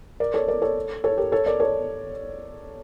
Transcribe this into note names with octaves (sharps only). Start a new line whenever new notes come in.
A#4 D5
A4 C#5
A#4 D5
A4 C#5
A4 C#5
G4 A#4
A4 C#5
A#4 D5
A4 C#5